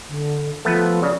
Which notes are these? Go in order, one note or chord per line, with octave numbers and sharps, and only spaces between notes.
D3
F3 A3 B3 B4
C#3 D5